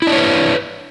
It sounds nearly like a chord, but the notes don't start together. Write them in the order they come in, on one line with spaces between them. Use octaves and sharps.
E4 D4 C#5 B4